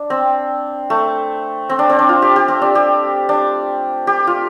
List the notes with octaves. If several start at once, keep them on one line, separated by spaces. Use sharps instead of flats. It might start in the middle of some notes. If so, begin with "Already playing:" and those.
Already playing: D4
C4
A3
C4
D4
C4
D4
F4
G4
G4
C4
D4
G4
D4
G4
F4